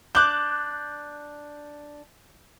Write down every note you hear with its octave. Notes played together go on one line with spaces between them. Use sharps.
D4 D6 F#6 G6